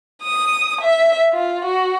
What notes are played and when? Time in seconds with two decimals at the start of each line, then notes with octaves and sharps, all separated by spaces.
0.23 D#6
0.82 E5
1.33 F4
1.64 F#4